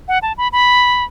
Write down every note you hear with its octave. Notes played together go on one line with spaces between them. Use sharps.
F#5
A5
B5
B5